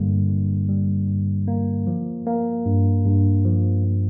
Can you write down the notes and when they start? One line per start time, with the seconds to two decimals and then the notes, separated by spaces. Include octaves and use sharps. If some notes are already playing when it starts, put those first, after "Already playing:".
Already playing: G2 D3 G3 A#3
0.29 D3
0.69 G3
1.07 G2
1.48 A#3
1.87 F3
2.26 A#3
2.65 G2
3.05 G2
3.45 F3
3.84 A#3